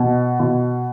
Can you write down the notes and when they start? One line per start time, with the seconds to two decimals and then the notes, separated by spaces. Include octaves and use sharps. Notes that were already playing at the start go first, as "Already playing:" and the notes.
Already playing: B2
0.39 B2